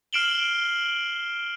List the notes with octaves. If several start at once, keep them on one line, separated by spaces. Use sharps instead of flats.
F6 C7 D7 E7 F#7 G7